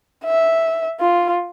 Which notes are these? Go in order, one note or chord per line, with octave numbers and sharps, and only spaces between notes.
E5
F4